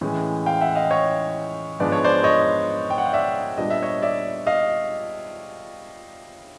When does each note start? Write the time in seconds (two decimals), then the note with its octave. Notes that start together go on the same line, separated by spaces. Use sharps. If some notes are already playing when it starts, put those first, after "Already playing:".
0.01 A2 E3 G#3 C#4
0.46 F5 G5
0.61 E5 F#5
0.75 D#5 F5
0.90 C#5 D#5
1.80 G#2 F3 G#3 B3 D4 D5
1.92 C#5
2.04 C5 D5
2.24 C#5 D#5
2.90 G5
2.98 F#5
3.06 F5
3.13 D5 E5
3.58 A#2 G3 B3 D4 D#5
3.70 E5
3.83 C#5 D#5
4.02 D5 E5
4.47 D#5 F5